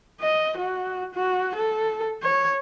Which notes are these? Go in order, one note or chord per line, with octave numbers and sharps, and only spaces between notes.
D#5
F#4
F#4
A4
C#5